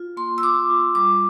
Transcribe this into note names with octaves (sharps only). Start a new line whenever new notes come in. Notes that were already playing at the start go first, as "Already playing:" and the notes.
Already playing: F4
A#3 C6
E6
F4 D6
F4
G3 D6